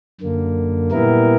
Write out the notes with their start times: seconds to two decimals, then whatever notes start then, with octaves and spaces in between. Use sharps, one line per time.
0.21 F#2 D3 A#3
0.91 A#2 G3 B3 E4 A#4